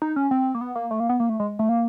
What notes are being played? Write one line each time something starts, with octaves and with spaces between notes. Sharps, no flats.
D#4
C#4
C4
A#3
B3
A#3
A3
A#3
B3
A#3
A3
G#3
A3
A#3